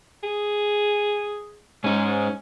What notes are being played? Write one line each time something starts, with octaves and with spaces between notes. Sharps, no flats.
G#4
G#2 C#4 D#4